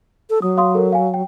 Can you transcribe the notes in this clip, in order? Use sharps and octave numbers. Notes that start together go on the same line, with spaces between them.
A4
F#3 D#6
F5 C6 D#6
A4 A#4
F5 G#5
G5